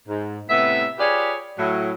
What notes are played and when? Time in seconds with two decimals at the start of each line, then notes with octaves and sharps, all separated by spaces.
0.08 G#2
0.50 A2 C3 B3 E5
0.99 F4 G4 G#4 B4 C#5 D5
1.58 A2 F#3 E4